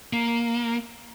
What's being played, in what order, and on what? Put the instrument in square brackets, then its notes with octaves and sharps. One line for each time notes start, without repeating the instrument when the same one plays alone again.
[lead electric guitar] A#3